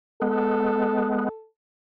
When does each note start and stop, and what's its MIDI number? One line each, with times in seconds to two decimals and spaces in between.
0.22 1.29 56
0.22 1.29 59
0.22 1.47 69